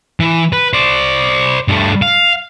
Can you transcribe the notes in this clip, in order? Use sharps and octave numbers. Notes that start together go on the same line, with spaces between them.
E3
B4
C5 D5
G2 A3
F5